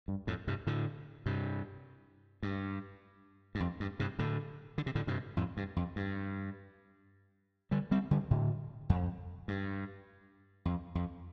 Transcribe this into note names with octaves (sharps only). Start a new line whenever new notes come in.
G2
F2 A2
G2 C3
A2 D3
G2 C3
G2
G2
F2
G2
G2 C3
A2 D3
D3
C3
A2 D3
G2 C3
F2 A2
G2
F2
G2
D3 G3
G3 C4
D3 G3
A2 D3
F2
G2
F2
F2